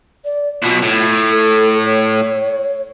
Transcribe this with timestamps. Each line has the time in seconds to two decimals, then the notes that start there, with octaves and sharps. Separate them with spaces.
0.25 D5
0.62 B1 B2 F4
0.83 A2
1.31 A4
1.85 C#5